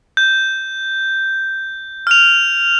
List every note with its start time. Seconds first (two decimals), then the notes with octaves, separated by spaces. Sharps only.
0.17 G6
2.07 F6 F7